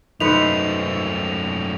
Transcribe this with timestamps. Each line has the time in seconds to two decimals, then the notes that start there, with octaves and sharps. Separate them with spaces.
0.20 F#2 A3 D#4 B4 C5 C#7 F7